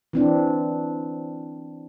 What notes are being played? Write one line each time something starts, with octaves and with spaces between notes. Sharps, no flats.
E3 C4 D4